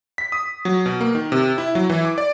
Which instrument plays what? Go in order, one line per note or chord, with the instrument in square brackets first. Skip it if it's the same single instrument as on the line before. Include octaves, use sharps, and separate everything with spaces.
[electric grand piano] B6
D#6
F#3
B2
A#3
D#3
C3
E4
F#3
E3
D6
D5